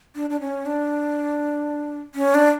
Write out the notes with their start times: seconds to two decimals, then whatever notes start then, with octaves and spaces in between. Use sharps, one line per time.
0.15 D4
0.30 D4
0.41 C#4
0.66 D4
2.15 C#4
2.34 D4